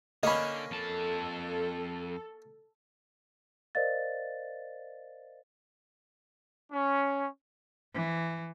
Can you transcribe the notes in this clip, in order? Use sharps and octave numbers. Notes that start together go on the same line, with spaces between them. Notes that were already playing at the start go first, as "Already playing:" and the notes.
D3 A#3 C#4 D#5 B5
F2 A4 A5
A#4 C5 D5 D#5 F5 A6
C#4
E3